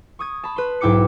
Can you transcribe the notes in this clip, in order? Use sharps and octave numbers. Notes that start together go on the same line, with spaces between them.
C#6 D#6 G#6
A5 B5
B4 C6
B1 G#2 E4 G5 D6 C#7